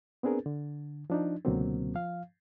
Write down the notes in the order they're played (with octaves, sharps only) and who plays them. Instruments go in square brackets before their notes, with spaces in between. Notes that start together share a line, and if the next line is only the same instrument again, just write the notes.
[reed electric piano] B3 C4 D4 G#4 A#4 B4
D3
F3 D4 D#4
C#2 B2 D3 F#3 A#3 C4
F3 F5